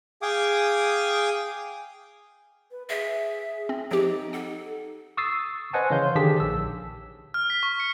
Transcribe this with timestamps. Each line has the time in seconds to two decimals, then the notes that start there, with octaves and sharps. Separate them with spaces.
0.22 G#4 F5 G5 G#5 D6 D#6
2.71 B4
2.90 G#4 E5
3.69 C4
3.91 F3 C4 D#4 G4
4.33 A4 F#5
5.17 C#6 D#6 E6 A6 C7
5.73 B4 C5 D#5 F#5 G#5 A5
5.90 C#3 E3 C#5 F5 C6 G6
6.15 D3 D#3 G4 G#4 A5 B6
6.40 A#1 E6
7.34 F6
7.50 B6
7.63 C#6
7.80 C#7